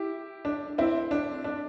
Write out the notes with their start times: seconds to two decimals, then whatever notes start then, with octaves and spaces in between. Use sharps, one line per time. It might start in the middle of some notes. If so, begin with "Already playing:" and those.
Already playing: E4 G4
0.45 D4
0.78 C4 E4
1.11 D4
1.44 D4